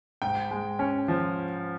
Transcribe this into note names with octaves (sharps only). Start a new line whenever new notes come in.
G#2 G5
G#3
C#4
F3